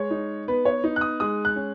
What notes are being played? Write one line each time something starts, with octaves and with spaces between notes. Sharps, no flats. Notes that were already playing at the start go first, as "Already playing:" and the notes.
Already playing: G#3 C#5
D#4
B3 B4
C#5
D#4
F#6
D#6
G#3 D#6
F#6
C#4